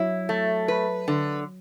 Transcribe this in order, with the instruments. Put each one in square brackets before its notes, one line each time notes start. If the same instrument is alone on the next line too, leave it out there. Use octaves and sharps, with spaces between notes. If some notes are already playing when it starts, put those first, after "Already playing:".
Already playing: [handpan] F#3 [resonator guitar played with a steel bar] E4
[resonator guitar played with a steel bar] A3
B4
D3